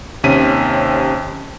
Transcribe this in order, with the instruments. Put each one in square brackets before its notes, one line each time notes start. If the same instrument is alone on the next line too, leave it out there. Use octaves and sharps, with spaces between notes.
[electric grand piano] D#2 C3 C#4 B6 D#7